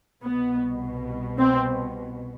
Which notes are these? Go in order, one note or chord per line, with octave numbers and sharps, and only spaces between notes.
C2 B2 B3
C4